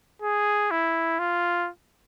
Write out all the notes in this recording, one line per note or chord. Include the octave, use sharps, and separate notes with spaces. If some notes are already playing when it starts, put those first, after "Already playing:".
G#4
E4
F4